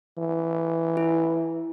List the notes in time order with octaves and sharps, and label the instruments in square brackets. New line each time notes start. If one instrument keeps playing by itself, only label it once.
[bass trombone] E3
[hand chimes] E4